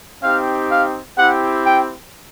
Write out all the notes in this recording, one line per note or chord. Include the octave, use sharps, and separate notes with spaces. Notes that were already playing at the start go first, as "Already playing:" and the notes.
C4 D#4 G4 F5
F5
C4 E4 G4 F#5
G5